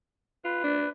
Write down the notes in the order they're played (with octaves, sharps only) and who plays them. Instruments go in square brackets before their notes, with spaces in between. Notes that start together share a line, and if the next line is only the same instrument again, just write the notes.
[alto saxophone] F4 [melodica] B4
[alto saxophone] D4